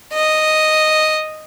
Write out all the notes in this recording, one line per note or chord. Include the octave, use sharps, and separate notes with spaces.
D#5